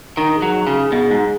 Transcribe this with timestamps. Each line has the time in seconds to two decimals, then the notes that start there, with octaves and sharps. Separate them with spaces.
0.17 D#3 D#4
0.36 G#4
0.42 F#3
0.67 C#3
0.73 G#4
0.92 B2 G#4
1.11 G#2